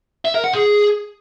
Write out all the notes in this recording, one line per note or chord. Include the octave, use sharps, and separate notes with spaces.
E5
A#4
F#5
G#4